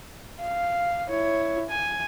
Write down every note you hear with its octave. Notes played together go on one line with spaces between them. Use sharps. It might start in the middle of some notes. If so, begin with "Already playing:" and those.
F5
E4 C#5
G#5